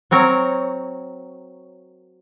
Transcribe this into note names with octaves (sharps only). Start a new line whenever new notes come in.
F#3 C4 A#4 C#5